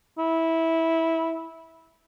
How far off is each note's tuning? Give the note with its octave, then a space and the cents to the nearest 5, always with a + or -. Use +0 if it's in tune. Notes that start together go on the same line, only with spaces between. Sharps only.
E4 -15